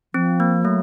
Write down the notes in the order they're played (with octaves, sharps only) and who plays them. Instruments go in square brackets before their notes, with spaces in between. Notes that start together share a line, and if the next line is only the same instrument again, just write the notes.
[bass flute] F3 [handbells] C4
[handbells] A#3
[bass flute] F#3 [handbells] A3